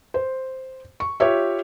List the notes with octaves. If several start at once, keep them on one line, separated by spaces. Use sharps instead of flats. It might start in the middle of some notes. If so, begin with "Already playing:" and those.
C5
C#6
F4 G4 C#5 E5